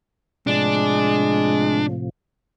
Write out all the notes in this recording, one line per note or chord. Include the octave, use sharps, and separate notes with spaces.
A2 C3 F3 G#3 D4